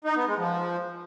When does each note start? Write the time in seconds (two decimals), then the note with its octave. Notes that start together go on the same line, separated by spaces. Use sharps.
0.05 D#4
0.16 B3
0.27 G#3
0.38 F3